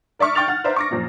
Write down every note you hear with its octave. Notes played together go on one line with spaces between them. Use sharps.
A#4 D5 E5 C#6 F6
G5 C#6 F6 A6 F7
F#5 F6
B4 C5 D5 E5 F#5 A#5
C#6 D6 A#6
F#2 A#2 F3 A#3